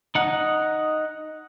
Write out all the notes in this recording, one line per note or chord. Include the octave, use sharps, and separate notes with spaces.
D#4 F#5